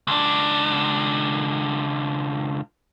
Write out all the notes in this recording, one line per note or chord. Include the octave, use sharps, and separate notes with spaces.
C#2 D4